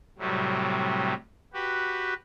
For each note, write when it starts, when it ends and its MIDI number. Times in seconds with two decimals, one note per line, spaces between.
0.18 1.13 45
0.18 1.13 48
0.18 1.13 54
0.18 1.13 55
1.53 2.14 66
1.53 2.14 67
1.53 2.14 71